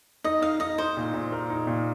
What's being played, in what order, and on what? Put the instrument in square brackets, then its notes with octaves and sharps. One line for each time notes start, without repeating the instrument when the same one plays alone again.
[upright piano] D#4 [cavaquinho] D#5
[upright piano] D#4 [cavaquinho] F5
[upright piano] D#4 [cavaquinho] D#5
[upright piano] D#4 [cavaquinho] C5
[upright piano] A#2
A#2
A#4
D#4
A#2